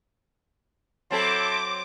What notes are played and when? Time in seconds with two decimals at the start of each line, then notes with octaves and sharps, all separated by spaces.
1.11 F#3 C4 E4 A4 A5 C6 D6